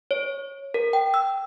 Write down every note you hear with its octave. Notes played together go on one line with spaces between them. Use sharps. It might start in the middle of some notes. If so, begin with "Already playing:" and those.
C#5
A#4
G5
E6